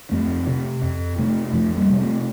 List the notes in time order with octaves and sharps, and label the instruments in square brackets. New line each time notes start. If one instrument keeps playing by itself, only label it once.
[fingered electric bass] F2 A3 C4
C3
F2
C3 A3 C4
F2 F3 A3
G3 A#3
C3
A3 C4